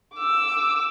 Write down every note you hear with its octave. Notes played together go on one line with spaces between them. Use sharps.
D6 E6